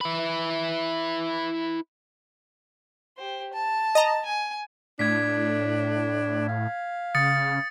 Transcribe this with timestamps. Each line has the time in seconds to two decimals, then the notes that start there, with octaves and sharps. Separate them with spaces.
0.01 E4 B4
3.17 G4 C5
3.53 A5
3.95 D#5 A#5
4.25 G#5
4.99 A2 D4 G#6 B6
6.49 F5
7.15 C#3 D#6 A6 C#7